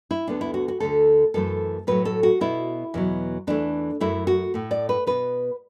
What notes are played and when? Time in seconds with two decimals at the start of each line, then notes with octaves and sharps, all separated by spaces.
0.11 E4
0.27 D2 D3 B3 D4
0.41 E4
0.54 F#4
0.68 F#4
0.80 D2 D3 A3 A4
1.34 F#2 E3 A3 A4
1.87 A2 F#3 A3 B4
2.05 A4
2.23 F#4
2.41 B2 B3 E4
2.94 E2 B2 F#3
3.47 E2 E3 A3 D4
4.00 F#2 F#3 A3 E4
4.27 F#4
4.54 A2 A3
4.71 D5
4.89 B4
5.07 B2 B3 B4